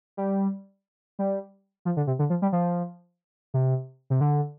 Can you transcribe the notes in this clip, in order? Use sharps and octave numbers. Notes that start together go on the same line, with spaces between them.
G3
G3
F3
D3
C3
D3
F3
G3
F3
C3
C3
D3